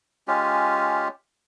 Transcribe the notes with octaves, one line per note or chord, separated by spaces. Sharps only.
G#3 C#4 F4 G4